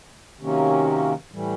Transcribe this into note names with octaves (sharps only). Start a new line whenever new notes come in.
C3 D#3 F#3 A#3 C#4
A2 E3 G3